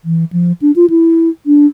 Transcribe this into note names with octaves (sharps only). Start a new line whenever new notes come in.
E3
F3
D4
F4
E4
D4